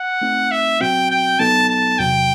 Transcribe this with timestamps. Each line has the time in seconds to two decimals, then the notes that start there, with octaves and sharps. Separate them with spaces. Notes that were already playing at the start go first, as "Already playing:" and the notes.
Already playing: F#5
0.21 A3 C4 D#4
0.51 E5
0.81 B2 F#3 C4 F#4 G5
1.11 G5
1.39 B2 F#3 B3 D#4 A4 A5
1.69 A5
1.98 E2 C3 F#3 G5